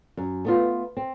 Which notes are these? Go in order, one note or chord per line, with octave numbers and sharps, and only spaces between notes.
F#2
A3 B3 F4
C4